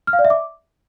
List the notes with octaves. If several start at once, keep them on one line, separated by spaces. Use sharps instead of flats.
F6
F5
D5
E5
D6